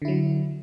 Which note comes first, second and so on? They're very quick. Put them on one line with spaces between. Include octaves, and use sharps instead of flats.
D3 E4 F#3